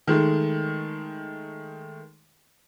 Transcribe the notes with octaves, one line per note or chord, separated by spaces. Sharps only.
D#3 G#3 A3